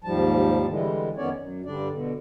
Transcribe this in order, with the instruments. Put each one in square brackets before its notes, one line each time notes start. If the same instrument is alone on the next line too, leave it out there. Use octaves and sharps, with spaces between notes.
[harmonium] D#2 G#2 F3 G3 A5
D3 E3 G3 G#3
F2 D#3 B3 C#4 C#5 D5
F#2
G2 D3 G3 D4 D5
B2 D3